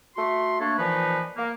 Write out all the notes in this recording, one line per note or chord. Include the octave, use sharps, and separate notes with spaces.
A3 F#4 C6
A3 A#3 D4 A4 C#5
A#2 E3 F3 D#4 B4
A#3